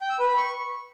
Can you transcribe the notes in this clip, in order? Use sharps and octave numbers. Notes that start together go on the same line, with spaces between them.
G5
E6
B4
B5
C#6